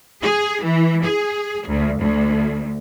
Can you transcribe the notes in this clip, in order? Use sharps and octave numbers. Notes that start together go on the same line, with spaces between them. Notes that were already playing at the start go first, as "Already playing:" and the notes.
G#4
E3
G#4
D2
D2